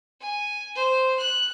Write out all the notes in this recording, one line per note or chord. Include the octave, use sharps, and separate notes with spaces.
G#5
C5
F#6